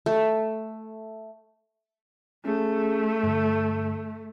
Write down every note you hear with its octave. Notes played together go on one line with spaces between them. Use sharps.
A3
A3 C#4 G#4
G2 D3